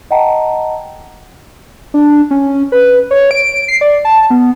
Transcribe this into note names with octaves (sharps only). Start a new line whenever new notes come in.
D#5 F#5 G5 A5 A#5
D4
C#4
B4
C#5
D7
C7
D5
A5
B3